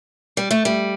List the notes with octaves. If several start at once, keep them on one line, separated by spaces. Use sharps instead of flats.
G3
A3
G3